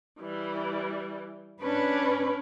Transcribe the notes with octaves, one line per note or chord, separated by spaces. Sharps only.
E3 G3
C#4 D4 B4